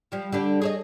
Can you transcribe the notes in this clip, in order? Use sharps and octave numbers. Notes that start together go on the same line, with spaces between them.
F3 G3
D3 G3 D4
G#4 C#5 D#5